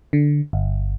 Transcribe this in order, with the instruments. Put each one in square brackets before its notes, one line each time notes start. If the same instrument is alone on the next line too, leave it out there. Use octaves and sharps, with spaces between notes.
[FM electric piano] D3
G1